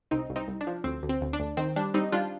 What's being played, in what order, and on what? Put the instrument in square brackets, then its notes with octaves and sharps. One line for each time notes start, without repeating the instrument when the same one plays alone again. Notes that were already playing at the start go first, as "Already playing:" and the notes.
[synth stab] C2 C4 D#4
C2
C4 D#4
C2
D4
F3
D2 C4
D2
C4
D2
D4
D2
D#3 C4
G3 D4
G3 C4 D#4
G3 D4 F4